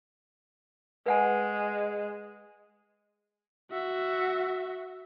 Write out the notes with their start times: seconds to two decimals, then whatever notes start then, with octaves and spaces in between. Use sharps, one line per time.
1.06 G#3 B4 F#5 G#5
3.71 F#4 E5